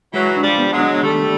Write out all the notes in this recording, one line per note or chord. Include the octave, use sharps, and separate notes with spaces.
E3 F#3 G#3
D4
F3 G3
B3
F#3 G#3
D4
D#3 G3 A3